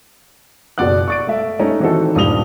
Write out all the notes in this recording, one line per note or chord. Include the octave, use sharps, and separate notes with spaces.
F#1 B2 D5 F#5 F#6
C#6 A6 D7
A3 E5
A3 C#4 D#4 A#5
D#3 E3 C4 D#4 F#4 A4
D#1 G2 G3 D#6 F7 G7